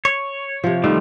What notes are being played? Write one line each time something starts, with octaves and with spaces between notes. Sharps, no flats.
C#5
C3 F3
D#3 F3 G3 A3